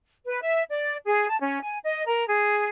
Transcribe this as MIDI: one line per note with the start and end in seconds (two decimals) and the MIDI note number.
0.26 0.40 71
0.41 0.63 76
0.69 0.97 74
1.04 1.27 68
1.28 1.37 81
1.40 1.62 61
1.62 1.77 80
1.84 2.03 75
2.06 2.25 70
2.27 2.70 68